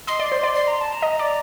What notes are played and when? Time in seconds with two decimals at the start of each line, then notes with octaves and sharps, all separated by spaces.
0.07 D#5 C6
0.20 D5
0.32 C5
0.43 D5
0.55 C6
0.68 A#5
0.81 A5
0.92 A#5
1.02 D#5
1.19 D5